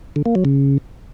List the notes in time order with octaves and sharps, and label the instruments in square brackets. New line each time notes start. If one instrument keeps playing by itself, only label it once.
[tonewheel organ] D3
A#3
F#3
C#3